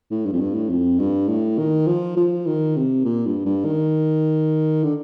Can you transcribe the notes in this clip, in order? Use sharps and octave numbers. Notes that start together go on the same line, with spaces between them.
A2
G2
F2
G2
A2
F2
G2
A2
D#3
F3
F3
D#3
C3
A#2
G2
G2
D#3
D3